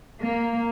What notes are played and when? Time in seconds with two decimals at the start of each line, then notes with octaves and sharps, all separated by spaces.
0.22 A#3